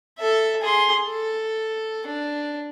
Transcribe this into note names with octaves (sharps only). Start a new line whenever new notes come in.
A4 E5
G#4 C6
A4
D4